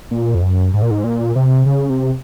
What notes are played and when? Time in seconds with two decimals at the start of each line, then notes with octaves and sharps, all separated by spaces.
0.11 A#2
0.35 F2
0.42 F#2
0.74 G#2
0.82 A#2
0.91 G#2
1.04 A#2
1.36 C3
1.66 C#3
1.90 C3